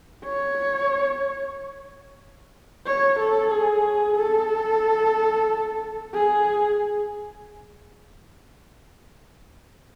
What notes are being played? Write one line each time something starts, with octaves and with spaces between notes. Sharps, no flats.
C#5
C#5
A4
G#4
A4
G#4